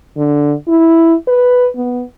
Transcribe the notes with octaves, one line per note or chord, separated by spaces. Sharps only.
D3
E4
B4
B3